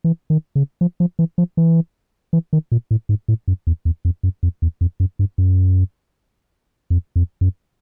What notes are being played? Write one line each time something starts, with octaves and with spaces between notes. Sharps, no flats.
E3
D#3
C#3
F3
F3
E3
F3
E3
E3
D#3
A#2
A2
G#2
A2
F#2
E2
E2
F2
F#2
F2
E2
F2
F#2
G2
F#2
F2
F2
F#2